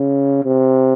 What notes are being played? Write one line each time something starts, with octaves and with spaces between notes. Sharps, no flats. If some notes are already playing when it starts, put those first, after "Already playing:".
Already playing: C#3
C3